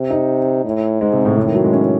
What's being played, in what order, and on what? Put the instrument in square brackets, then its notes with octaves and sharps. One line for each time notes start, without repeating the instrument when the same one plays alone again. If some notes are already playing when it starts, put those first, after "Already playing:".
Already playing: [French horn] C3
[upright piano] D#4
[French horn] A2
[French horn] G#2 [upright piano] G#3
[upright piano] C3
A2
[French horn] A2 [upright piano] C3
[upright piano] D#3
F#3
G#3
C#4